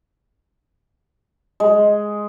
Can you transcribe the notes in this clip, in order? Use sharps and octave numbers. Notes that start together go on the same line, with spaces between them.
G#3